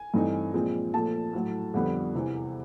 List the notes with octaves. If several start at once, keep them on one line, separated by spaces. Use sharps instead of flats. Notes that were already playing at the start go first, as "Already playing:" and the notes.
Already playing: G#5
G2 E3 A3 C4 D#4
A#2 F3 G#3 C4
A#2 F3 A3 A5
A2 F#3 A3
F2 D3 G3 B3 D4
E2 C3 E3